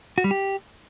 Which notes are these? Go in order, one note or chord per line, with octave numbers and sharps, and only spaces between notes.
F#4
G3
G4